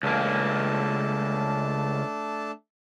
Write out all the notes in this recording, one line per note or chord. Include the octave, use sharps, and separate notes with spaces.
C#2 A3 A#3 D4 A5